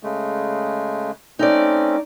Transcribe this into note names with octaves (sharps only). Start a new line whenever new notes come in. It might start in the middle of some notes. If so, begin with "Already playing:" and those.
C#3 G#3 A3
A3 C4 C#4 D#4 D5